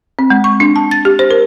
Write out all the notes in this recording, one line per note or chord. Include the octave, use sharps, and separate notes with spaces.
C4
G#3
C#6
D4
A5
A6
G4
C5
A#4